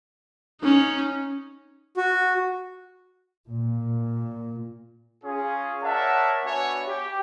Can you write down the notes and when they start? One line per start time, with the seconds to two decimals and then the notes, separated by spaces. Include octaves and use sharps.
0.62 C#4 D#4
1.97 F#4
3.51 A#2
5.24 C#4 F4 G#4
5.83 A#4 C#5 D5 E5 F#5 A5
6.45 B3 D4 F#4 C#5 E5 G#5
6.88 G4